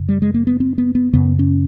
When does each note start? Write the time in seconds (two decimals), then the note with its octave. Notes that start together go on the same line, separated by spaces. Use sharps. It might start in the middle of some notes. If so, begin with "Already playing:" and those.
Already playing: F#2 C#3
0.09 G3
0.22 G#3
0.34 A#3
0.47 B3
0.60 C4
0.78 B3
0.95 B3
1.13 F#2 C#3 B3
1.39 C#4